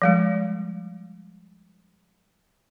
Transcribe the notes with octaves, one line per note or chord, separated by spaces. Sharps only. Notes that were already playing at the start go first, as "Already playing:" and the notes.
F3 G3 G#3